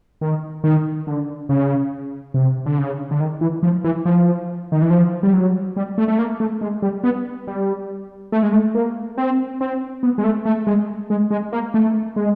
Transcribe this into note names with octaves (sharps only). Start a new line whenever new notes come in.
D#3
D#3
D3
C#3
C3
D3
C#3
D3
D#3
E3
F3
E3
F3
D#3
E3
F3
G3
F#3
G3
A3
A3
A#3
A3
G#3
G3
B3
G3
A3
G#3
A3
A#3
C4
C4
B3
G#3
A3
A3
G#3
G#3
G#3
A#3
A3
G#3